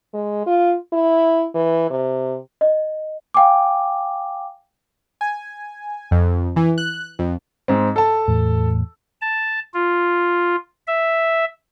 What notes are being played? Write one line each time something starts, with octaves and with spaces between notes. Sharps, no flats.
G#3
F4
E4
E3
C3
D#5
F5 G5 G#5 D6
G#5
F2
E3
F#6
F2
G#2 C4
A4 A5
E2 A2
A5
F4
E5